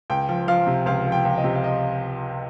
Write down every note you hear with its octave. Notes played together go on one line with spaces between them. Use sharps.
C#2 G5
F3
F3 F5
C3
C#2 F5
F3
G5
C#2
D#5
C3
F5
D#5